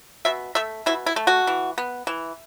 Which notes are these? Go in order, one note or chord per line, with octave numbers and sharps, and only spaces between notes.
B2 E5
A3 E5
B2 E4
E4
A3
F#4
E3
B3
E3